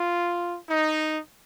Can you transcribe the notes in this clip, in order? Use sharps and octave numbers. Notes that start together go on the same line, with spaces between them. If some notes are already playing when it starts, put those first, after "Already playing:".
Already playing: F4
D#4